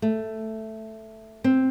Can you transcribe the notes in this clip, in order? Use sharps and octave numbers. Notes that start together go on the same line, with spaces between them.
A3
C4